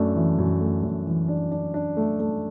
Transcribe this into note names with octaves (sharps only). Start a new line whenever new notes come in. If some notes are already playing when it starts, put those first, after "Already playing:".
Already playing: F#2 A3 D4
E3
F#2
A3
F#2
E3
D4
D4
D4
A3
A3